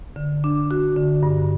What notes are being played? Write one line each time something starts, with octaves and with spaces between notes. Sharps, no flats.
D3
D4
F#4
D3
G2